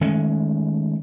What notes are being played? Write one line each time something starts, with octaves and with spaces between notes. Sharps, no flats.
D#3 G#3 A3 C#4